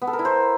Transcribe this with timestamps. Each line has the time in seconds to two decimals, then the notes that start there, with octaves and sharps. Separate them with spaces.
0.02 B3
0.07 A4
0.13 A#4
0.19 E4
0.25 C5